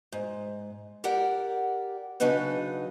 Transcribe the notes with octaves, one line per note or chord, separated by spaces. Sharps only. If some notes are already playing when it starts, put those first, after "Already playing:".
G#2
G4 A#4 D5 F#5 G5
C#3 F#3 D4 D#4 B4 D#5